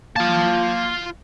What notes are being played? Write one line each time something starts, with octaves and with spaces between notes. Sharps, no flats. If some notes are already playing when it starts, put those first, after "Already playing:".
A#3 F4 A5